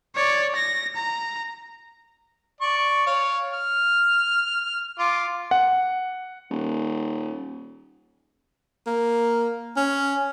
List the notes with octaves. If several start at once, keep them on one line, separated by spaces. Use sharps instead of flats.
C#5 D5
A#6
A#5
D5 C#6
C#5 F5
F6
F4 C6 D6
F#5
D#1
A#3
C#4